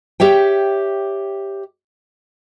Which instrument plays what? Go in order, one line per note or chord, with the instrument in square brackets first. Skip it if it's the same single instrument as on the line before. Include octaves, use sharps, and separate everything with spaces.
[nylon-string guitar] G4 C#5 E5 G5